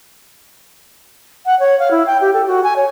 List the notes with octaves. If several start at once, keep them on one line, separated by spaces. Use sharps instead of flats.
F#5
C#5
F5
E4
G5
G4
A4
F#4
G#5
C#5